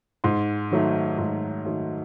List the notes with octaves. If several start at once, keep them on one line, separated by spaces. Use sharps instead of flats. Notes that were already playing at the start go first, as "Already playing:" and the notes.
G#2 C6
D#3 F#3 A3
G#2
D#3 F#3 A3